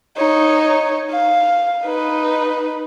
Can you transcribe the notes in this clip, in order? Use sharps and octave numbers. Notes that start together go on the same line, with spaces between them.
D#4 C#5
F5
D#4 B4